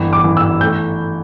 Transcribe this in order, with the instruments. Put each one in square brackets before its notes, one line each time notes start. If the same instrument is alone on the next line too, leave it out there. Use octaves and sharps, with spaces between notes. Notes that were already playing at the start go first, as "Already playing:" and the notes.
Already playing: [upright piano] G1 E3
D6
E3
E6
A3 G6